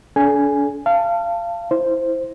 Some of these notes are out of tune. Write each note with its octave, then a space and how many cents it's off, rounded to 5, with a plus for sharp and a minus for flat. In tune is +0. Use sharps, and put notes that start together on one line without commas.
D4 -40 A4 -40 G#5 +0
F5 -25 A5 +10
E4 -10 C5 +0